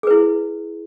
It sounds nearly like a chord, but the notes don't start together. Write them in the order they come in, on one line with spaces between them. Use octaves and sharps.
G#4 B4 E4